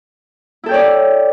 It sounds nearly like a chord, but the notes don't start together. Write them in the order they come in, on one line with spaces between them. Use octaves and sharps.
E4 A4 G5 C#5 D5